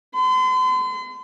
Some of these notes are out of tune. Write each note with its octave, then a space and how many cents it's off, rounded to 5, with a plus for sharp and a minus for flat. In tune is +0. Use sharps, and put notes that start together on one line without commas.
C6 -40